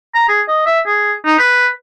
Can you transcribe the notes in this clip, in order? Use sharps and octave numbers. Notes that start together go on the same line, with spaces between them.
A#5
G#4
D#5
E5
G#4
D#4
B4